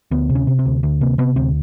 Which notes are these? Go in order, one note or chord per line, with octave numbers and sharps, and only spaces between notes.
D2 B3
C3
C#4
C3
C4
D2
D2
C3 A#3
C3 B3
D2 C4